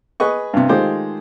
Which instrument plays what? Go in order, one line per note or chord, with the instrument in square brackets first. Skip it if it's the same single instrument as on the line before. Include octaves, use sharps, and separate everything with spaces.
[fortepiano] G#4 B4 D#5 C#6
G2 C3
D#3 G#3 A3 F4 G4 C5